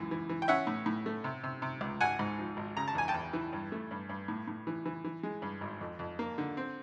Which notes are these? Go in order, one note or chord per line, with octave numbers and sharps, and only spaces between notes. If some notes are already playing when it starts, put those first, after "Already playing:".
Already playing: C#2 F#2 E3
E3
E3
G5
C#4 E5 F#5
A2
A2
A3
C3
C3
C3
C#2
G#1 F#5 G#5
G#2
F3
G#1
C#3 A#5
A5
E2 G#5
G5 A5
E2
E3
G2
A3
G2
G2
A2
A2
E3
E3
E3
G#3
G2
G#1
F2
F2
A#3
D3
C4